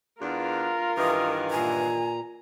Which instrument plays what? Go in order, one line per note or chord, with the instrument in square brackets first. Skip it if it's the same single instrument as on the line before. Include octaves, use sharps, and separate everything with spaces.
[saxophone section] E2 B3 D4 [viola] F4 A#4
[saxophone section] G2 D#3 E3 [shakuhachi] D#6
[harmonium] A#2 A#5 [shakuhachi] G#5